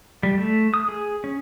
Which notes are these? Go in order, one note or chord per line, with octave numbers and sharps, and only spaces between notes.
G3
A3
D#6
G#4
C#4